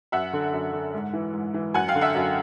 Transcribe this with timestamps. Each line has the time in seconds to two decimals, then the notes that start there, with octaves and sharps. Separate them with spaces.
0.12 F#2 E5 F#5
0.33 D3
0.53 F#2
0.73 D3
0.94 G#2
1.13 E3
1.33 G#2
1.54 E3
1.74 F#2 F#5 G#5
1.88 F5 G5
1.95 D3
2.01 E5 F#5
2.15 F#2